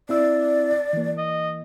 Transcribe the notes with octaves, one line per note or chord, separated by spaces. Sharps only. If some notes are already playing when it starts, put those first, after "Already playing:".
C4 E4 D5 E6
E3 A#3
D#5